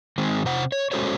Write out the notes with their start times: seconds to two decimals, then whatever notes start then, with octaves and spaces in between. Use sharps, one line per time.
0.18 D#3 G#3 C4
0.45 C3 C5 F#5
0.72 C#5
0.92 G#3 C#4 F#4 A4 C5 C#5